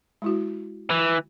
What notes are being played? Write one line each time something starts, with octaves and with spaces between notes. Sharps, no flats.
G#3 E4 F#4
E3